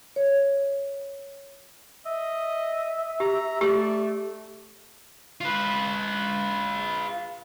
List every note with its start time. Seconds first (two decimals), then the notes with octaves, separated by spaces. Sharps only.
0.16 C#5
2.05 D#5 E5
3.20 G4 A#5
3.61 A3 G4 D5
5.41 F4 B4